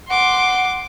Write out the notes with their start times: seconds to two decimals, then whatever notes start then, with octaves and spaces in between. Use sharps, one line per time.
0.10 F#5 C6 D6